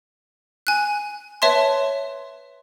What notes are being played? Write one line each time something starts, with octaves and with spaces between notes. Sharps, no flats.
G#5 F#6
B4 C#5 E5 A5 C6